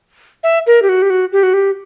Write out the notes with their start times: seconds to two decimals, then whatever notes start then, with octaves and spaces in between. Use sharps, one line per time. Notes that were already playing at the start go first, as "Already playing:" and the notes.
0.43 E5
0.67 A#4
0.82 G4
0.89 F#4
1.02 G4
1.10 F#4
1.32 G4
1.43 F#4
1.53 G4